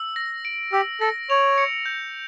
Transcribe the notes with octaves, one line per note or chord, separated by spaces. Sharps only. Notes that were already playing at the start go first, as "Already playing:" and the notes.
Already playing: E6
A#6
D7
G4 E6
A4 A#6
C#5 F7
C#7
G6